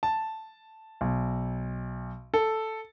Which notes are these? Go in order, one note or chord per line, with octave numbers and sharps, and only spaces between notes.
A5
B1
A4